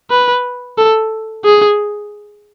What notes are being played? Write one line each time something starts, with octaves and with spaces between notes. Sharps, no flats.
B4
A4
G#4